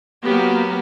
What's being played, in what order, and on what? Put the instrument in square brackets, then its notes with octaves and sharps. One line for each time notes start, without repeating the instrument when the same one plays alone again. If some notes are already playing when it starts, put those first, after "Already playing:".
[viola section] F#3 A#3 B3 G4